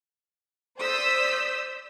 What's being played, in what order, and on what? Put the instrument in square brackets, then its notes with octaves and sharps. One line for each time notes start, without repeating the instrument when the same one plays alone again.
[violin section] C5 D5 D#6 E6 G6 B6